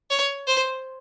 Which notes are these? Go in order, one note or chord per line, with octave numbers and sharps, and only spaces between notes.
C#5
C5